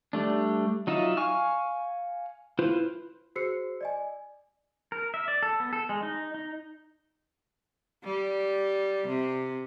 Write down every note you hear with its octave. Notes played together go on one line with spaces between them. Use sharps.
G3 A3 D4
F#3 D#4 F4 D#5 E5
F5 G#5 C#6 F6
E4 F4 B4 C5
F#4 G#4 C5 E6 C7 C#7
D5 D#5 G#5
A#4
E5
D5
A4
B3
A4
G#3
D#4
D#4
G3
C3